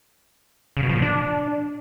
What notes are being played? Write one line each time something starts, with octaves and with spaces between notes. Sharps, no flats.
C#3
B2
F3
A#2
D4